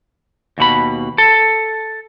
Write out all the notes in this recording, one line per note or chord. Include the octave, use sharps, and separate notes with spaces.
D#2 B2 B5
A4